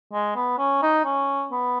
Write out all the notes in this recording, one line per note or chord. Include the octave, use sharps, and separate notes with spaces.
G#3
B3
C#4
D#4
C#4
B3